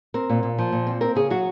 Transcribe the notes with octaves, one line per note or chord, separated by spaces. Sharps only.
C4 A#4
A#2
A#2
F3
A#2
C4
C4 A#4
C#3 G#4
F#3 F#4